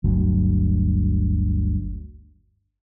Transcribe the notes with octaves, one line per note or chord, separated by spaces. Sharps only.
G1 D2 F#3